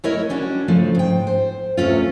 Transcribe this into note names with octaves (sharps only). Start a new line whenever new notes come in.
F#3 A3 E4 A#4 C#5 D#5
G3 C#4 D4 F#4
C#3 F3 A3
G#2 G5
C5
E2 C3 A3 C#4 F4